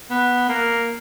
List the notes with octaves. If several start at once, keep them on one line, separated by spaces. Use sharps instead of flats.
B3
A#3